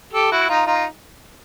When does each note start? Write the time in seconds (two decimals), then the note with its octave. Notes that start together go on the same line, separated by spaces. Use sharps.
0.13 G4 A4
0.32 E4 F#4
0.49 D#4 F4
0.66 D#4 F4